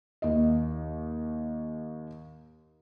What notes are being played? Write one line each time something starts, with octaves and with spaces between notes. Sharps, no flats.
D#2 D#5